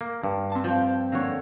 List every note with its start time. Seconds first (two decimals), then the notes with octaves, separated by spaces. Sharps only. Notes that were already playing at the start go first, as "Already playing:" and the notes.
0.01 A#3
0.24 G2
0.52 C4 A5
0.64 F3 G5
1.12 F2 D3 A#3 C#5